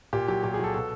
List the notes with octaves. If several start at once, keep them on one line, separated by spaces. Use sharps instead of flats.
A#2 G4
F#3 G4
A#2 G4
G#4
F#3 A4
B2 A4